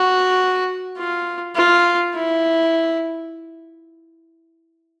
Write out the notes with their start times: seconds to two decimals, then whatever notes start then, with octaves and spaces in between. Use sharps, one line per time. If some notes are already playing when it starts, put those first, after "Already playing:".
Already playing: F#4
0.98 F4
1.56 F4
2.15 E4